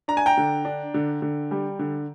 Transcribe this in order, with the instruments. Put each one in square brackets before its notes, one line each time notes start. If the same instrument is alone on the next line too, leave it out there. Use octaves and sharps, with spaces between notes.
[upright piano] D4 A#5
G#5
G5 A#5
D3
D4
D3
D3
G3
D3